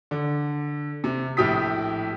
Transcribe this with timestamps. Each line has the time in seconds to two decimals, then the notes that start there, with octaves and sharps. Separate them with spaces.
0.11 D3
1.04 C3
1.37 A#1 A2 E4 G4 D#6 B6